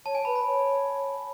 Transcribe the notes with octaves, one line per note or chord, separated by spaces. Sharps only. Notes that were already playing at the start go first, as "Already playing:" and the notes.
C#5 A5
G#5
B4 B5
B5
C#5